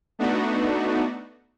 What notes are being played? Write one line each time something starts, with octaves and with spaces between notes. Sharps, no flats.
A3 B3 D4 D#4 F#4